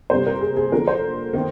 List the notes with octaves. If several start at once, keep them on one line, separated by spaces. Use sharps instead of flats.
C3 G3 A#3 C5
A#4
G#4
G#4
D3 F3 A#3 A#4
C5
D#3 A#3